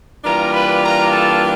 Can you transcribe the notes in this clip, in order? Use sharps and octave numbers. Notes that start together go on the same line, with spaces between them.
E3 G3 A#3 D4 F4 A#4 A#5
B4 B5
A#4 A#5
A4 A5